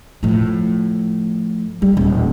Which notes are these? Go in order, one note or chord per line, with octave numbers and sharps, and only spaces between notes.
A2 F3
G3
D#1